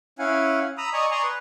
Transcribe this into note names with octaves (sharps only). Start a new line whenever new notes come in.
C#4 E4 F5 F#5 G#5
A#5 B5 D#6 E6
D5 D#5 G#5 A#5 C#6 D#6
D5 G#5 A#5 C6 C#6 D#6
B4